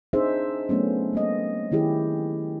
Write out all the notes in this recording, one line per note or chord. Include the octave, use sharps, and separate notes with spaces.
C4 D4 D#4 G#4 C5 E5
F#3 A3 B3 C#4
G#3 A#3 D#5
D#3 E4 G4 G#4